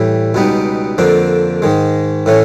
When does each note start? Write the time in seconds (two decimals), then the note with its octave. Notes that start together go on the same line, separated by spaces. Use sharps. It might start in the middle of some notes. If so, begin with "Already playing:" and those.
Already playing: A2 E3 G3
0.34 C#2 B2 G3 B3 D#4
0.98 F2 D3 F3 A#3 D4
1.62 G#2 D#3 G#3
2.26 A2 E3 A3 C#4